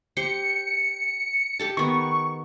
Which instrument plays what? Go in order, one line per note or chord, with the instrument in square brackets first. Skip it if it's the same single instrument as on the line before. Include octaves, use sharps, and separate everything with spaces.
[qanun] G4 C5 G5 [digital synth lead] C#7
[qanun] G4 A4 A5
[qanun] D#3 B3 [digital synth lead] C#6